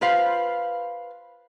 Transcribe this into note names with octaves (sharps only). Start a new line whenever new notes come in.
F4 B4 C5 F5